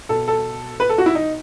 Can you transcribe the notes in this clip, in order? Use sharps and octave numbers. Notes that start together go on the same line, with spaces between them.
B2 A4
A4
B4
A4
F#4
E4
D#4